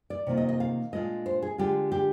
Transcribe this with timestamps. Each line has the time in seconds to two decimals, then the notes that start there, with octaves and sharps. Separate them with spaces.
0.10 D5
0.27 C3 D#3 A#3 F4
0.37 D#5
0.49 D#5
0.60 F5
0.92 A#2 G#3 D4 F4 D#5
1.26 C5
1.42 G#4
1.58 D3 G#3 D4 F4 G4
1.92 G4